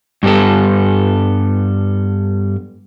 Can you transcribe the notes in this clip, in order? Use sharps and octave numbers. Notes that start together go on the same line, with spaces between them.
G2 G3 B3 A4